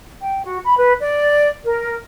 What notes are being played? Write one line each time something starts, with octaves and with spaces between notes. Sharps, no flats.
G5
F#4
B5
B4
D5
A#4